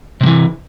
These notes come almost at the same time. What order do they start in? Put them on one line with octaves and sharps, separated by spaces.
C3 G3 E3